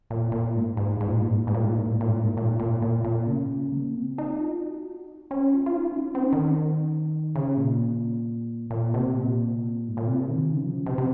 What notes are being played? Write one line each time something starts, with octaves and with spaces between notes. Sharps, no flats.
A#2
A#2
G#2
G#2
G#2
A#2
G#2
A#2
G#2
A#2
G#2
A#2
G#2
A#2
G#2
A#2
G#2
A#2
G#2
A#2
G#2
A#2
A#2
A#2
A#2
C#3
A#3
C4
D#4
F4
F#4
C#4
F4
F4
D#4
C#4
D#4
C4
C#4
D#3
C#3
A#2
A#2
C3
A#2
G#2
A#2
C3
D#3
C#3
F3
C#3
C3
C3